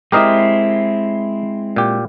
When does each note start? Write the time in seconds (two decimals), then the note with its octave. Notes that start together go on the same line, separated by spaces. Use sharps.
0.12 G#3 C4 E4 G4 A#4 D#5
1.76 A#2 G4